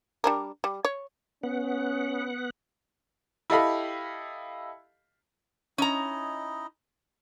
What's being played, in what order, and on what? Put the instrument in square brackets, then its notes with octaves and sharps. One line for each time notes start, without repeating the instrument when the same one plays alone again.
[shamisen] G3 D4 A#4
G3
C#5
[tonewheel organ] B3 F#5 [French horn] C#4
[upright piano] E4 G4 A4 D#5 F5 B5
[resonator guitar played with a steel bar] C#4 A#5 [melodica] D#4 E4 D#5